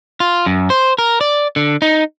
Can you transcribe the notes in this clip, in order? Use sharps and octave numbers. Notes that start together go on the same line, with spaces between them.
F4
F#2
C5
A#4
D5
D3
D#4